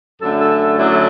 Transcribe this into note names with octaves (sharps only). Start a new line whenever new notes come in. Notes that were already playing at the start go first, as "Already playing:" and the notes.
F#2 D3 A3 A4
A4
F#2 D3 F#3 A3 D4 E4
A4